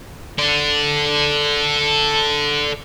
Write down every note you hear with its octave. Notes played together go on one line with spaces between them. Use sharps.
A4 D5